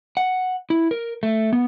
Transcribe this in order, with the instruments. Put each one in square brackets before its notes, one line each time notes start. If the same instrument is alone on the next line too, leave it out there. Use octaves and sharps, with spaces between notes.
[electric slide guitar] F#5
E4
A#4
A3
B3